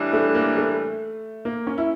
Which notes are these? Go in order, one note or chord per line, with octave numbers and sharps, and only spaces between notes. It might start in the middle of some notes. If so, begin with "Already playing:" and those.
Already playing: A2 E3 G3 D4
A3
A#3
A3
A#3
C#4
E4